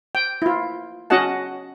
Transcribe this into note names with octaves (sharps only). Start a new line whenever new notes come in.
G5
E4 F4
C#4 F#4 D#5 F#5 A5